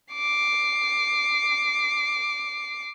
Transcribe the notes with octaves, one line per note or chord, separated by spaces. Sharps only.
D6 C7